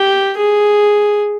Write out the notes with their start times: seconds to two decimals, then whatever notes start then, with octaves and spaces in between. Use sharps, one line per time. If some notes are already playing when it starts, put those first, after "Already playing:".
Already playing: G4
0.38 G#4